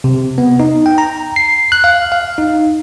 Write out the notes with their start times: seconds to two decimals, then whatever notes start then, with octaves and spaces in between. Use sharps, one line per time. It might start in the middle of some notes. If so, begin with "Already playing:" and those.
0.04 C3
0.38 B3
0.60 D#4
0.86 G5
0.98 A#5
1.36 C7
1.72 F#6
1.84 F5
2.12 F5
2.38 D#4